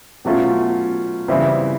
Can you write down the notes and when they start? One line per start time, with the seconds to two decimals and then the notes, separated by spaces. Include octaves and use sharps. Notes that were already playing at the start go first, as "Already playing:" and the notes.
0.25 B2 F#3 A3 C#4 F4
1.28 C#3 E3 G3 C4 E4